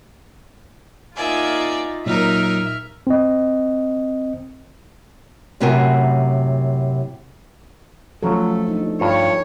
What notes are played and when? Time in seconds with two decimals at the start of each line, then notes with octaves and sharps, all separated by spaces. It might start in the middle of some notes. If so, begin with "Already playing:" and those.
1.16 A#3 D#4 F4 D5 E5 G#5
2.06 A#2 F#3 D#4 A#4 E5 F6
3.07 C4 D#5
5.60 F#2 A2 C3 F#4 A#4 G#5
8.23 F3 F#3 A3 C#4 F4 A4
8.68 D4 D#4
9.01 G2 F4 C#5